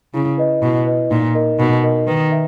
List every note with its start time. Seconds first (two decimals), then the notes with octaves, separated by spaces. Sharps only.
0.14 C#3 E4
0.38 B4 D#5
0.62 B2 E4
0.86 B4 D#5
1.10 A#2 D#4
1.35 A#4 D#5
1.59 B2 D#4
1.83 A#4 D#5
2.07 D#3 B4
2.32 E5